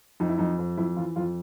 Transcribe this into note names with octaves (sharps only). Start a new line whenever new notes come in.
F2 D#4
E4
F2 D#4
F2
F2 E4
E3 F4
F2 F4